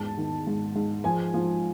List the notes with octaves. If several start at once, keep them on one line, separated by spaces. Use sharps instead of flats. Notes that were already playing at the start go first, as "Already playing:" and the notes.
Already playing: E2 G#2 A5
D#3
G#2
G#2
F3 G#5
F3